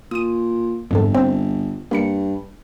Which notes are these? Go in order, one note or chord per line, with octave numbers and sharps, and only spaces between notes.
A#2 D#6 D#7
G1 F2 G#2 A4
C4
G2 A#3 B5 C#7